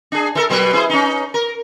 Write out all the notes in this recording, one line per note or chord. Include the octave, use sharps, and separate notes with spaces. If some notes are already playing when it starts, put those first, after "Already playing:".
D4 G#4
E3 A4 A#4
B2 F#3 B4
E4 G#4 C5
C#4 D#4
A#4